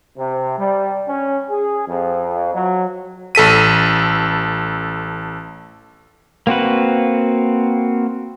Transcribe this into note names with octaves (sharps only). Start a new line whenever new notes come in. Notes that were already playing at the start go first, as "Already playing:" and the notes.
C3
G3
C#4
G#4
F2
F#3
A1 A4 B6 D#7
A#3 C4 F#4 B4